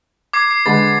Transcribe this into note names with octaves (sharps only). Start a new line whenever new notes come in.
D6 G#6 C7
C7
D3 G#3 B4 A6